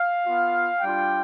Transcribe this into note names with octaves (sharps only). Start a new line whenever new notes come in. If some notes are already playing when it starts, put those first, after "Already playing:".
Already playing: F5
B3 F4
G3 D4 F4 G5